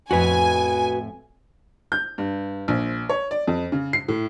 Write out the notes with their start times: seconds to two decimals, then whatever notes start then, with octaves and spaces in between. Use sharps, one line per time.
0.11 F2 A2 F#4 B4 G#5
1.92 G6
2.18 G2
2.68 A#1
3.09 C#5
3.31 D5
3.47 F2
3.72 C#3
3.93 C7
4.08 A2